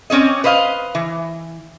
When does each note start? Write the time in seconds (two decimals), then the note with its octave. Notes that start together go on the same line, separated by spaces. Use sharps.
0.10 C4 C#4 D5 D#5
0.44 B4 C5 D#5 F5
0.95 E3